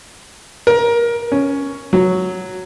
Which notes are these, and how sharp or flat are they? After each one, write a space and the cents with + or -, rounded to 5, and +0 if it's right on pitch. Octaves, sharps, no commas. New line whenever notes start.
A#4 +20
C#4 +5
F#3 +0